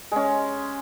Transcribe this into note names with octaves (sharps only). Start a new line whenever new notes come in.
G#3 C#4